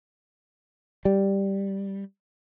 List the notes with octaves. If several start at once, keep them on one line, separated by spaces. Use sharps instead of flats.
G3